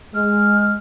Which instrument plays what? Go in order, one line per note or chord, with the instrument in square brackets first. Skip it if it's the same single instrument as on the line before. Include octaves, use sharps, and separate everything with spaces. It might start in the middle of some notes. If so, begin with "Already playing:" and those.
[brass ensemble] G#3 [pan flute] F6